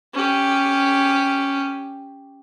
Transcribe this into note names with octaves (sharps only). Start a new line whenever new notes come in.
C#4 G4